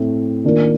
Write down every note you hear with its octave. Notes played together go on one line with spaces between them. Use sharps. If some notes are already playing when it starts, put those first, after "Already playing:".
Already playing: A2 A3 C4
D#3 A#3 D4 F4 A#4